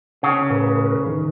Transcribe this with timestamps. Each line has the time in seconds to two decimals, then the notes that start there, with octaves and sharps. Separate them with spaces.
0.23 C#3
0.50 A2 A#4 B4
1.06 D#3